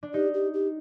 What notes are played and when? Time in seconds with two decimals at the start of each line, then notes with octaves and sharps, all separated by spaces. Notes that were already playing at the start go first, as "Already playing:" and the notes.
0.03 D4
0.14 D#4 G4
0.34 G4
0.54 G4